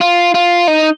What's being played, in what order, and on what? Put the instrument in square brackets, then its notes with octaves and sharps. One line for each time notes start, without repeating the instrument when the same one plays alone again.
[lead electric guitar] F4
F4
D#4